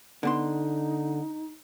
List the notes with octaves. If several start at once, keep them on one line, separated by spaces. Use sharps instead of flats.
D3 B3 D#4 C6